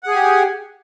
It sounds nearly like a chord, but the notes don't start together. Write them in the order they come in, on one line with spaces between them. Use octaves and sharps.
F#5 G#4 G#5 G4